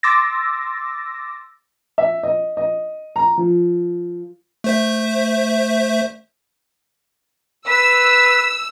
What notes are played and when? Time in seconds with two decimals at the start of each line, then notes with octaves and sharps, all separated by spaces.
0.03 C6 D6 E6 A6 A#6
1.98 E5
2.23 D#5
2.57 D#5
3.16 A#5
3.37 F3
4.64 A3 C5 E5
7.68 B4 E6